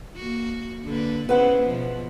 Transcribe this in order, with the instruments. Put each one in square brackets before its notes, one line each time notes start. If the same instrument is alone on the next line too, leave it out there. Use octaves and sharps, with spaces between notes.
[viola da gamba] A#3 F#4
D3 A#3 B4
[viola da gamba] C#3 B3 E4 [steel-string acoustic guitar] B4 C5 F#5
[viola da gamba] B2 F3